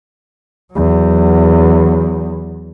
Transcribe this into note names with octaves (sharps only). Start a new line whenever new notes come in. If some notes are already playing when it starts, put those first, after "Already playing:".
E2 F#3